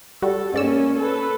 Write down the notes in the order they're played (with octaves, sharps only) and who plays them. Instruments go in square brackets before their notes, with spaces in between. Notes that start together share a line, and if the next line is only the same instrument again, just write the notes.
[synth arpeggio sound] G3 F#4 [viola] A4
[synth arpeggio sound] G#2 D5 E6 [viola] A#3 C#4
[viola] A4 B4